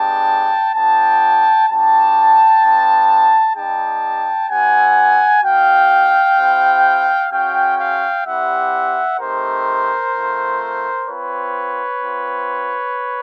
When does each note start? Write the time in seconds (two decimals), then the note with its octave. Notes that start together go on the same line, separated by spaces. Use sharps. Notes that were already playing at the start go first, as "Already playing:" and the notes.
Already playing: G#3 B3 D4 G4 G5 A5
0.74 B3 D4 F#4 G5 A5
1.68 G3 B3 D4 F#4 G5 A5
2.62 B3 D4 F4
3.56 G3 B3 D#4 G4 G5 A5
4.49 C4 E4 G4 F#5 G#5
5.43 A#3 D#4 F#4 F5 G5
6.38 C4 E4 G4
7.32 G#3 C#4 F#4 F5 G5
7.78 F5 G5
8.25 G3 C4 E4 G4 E5 F#5
9.20 A3 C4 D#4 G4 A#4 C5
10.14 A3 C4 F4
11.08 C4 F4 B4 C#5
12.02 C4 F4